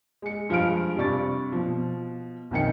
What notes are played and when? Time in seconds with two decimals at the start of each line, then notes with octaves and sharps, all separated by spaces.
0.22 G#3 C#7
0.49 G2 F3 G#3 F5 F6 D7
0.96 G2 C3 G3 D5 C#6 A6
1.52 B2 F3
2.51 B1 F2 D#3 G5 C#7